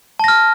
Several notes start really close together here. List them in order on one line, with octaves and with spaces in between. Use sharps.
A5 A#6 F6